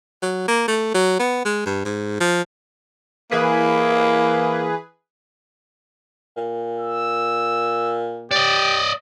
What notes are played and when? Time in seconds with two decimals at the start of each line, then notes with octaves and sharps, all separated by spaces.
0.22 F#3
0.48 A#3
0.68 A3
0.94 F#3
1.19 B3
1.45 G#3
1.66 G2
1.85 G#2
2.20 F3
3.31 E3 A#3 G#4 B4
6.37 A#2
6.79 E6
8.31 G4 D5 D#5